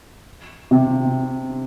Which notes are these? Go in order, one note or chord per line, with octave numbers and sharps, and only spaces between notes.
C3